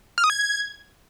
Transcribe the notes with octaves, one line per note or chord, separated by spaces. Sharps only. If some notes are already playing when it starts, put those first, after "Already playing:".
F6
D#6
G#6